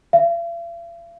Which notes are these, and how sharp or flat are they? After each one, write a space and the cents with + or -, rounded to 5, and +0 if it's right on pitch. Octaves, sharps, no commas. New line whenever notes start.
F5 -45